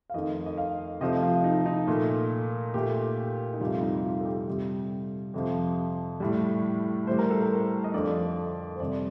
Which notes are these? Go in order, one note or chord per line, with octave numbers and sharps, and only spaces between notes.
F5
F2 D#3 A3 D#5
D#5
F5
C3 F3 A3 D#5
F4
D#4
D#4
A#2 A3
A#2 A3 G4
D#4
F2 C3 G3 F4
D#4
F4
A4
G4
C3 G3
F2 C3 F3
A2 G3
A2 G3 C5
A#4
A4
A#4
D#5
F2 D3 F3 D5
C5
F2 C3 G3 D5